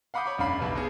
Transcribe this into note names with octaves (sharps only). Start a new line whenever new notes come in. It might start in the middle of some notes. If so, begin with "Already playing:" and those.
F5 F#5 B5 D6 D#6 G6
C#5 B5 C#6 D6
E1 F#2 D4 F5 B5
B1 G3 B4 F5
B2 B3 G#4